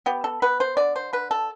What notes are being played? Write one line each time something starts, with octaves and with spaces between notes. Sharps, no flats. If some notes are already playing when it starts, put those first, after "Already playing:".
B3 G4
A4
B3 B4
C5
D3 D5
C5
D3 B4
A4